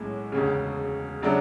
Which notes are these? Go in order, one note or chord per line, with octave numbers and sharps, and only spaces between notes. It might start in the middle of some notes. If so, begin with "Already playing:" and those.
Already playing: B1 A2 G#3 C#4
E1 D2 C#3
C#3 F#3 A3 D4